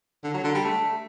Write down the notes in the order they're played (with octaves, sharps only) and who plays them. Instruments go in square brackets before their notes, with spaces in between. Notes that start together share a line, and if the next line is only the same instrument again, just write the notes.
[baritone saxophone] D3
F#3
D3
G3
A3